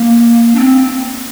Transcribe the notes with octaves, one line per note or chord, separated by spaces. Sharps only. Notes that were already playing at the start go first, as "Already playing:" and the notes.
Already playing: A#3
D4
C4